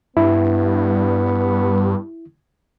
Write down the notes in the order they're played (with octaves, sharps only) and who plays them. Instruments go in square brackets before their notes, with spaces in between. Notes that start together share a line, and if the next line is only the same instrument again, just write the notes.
[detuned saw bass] G2 [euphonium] B3 [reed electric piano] E4